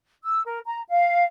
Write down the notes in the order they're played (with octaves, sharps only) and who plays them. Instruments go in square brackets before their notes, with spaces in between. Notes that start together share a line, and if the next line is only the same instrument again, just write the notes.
[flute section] E6
A#4
A#5
F5